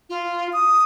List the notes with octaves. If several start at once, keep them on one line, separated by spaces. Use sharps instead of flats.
F4
D#6